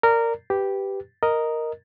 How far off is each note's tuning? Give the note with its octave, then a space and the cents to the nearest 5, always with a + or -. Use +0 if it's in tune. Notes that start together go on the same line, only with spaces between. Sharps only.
A#4 -15 D5 +0
G4 +0 B4 +5
A#4 +0 D#5 +0